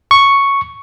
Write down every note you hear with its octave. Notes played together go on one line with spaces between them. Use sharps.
C#6